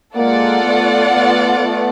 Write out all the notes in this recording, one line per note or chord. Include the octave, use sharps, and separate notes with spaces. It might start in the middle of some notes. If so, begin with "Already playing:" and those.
G#3 A#3 F4 A4 D5 F#5
A3 B3
A3 B3
A3 B3